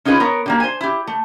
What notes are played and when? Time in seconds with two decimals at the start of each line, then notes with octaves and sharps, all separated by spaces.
0.05 C#4 D#4 F4 G#4 B4
0.20 B3 A#4 C#5
0.46 D3 G3 A#3
0.60 C5 G#5
0.81 E4 G4
1.07 A3